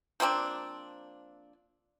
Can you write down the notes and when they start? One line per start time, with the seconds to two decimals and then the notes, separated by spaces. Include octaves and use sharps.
0.20 F3 A#3 C4 D4